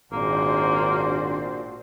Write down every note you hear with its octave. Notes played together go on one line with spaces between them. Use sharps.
G#1 A#2 A#3 D4 F#4 C5